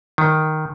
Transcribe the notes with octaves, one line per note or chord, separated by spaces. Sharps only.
D#3